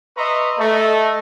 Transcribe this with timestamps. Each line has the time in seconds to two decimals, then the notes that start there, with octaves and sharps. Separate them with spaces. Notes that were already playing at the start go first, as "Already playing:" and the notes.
0.16 B4 D#5 E5 A#5 C6 C#6
0.58 A3 A4 D#5